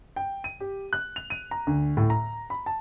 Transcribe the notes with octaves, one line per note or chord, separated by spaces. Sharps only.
G5
D#7
G4
F#6
F7
D#7
A#5
D2
A2
A#5
B5
A5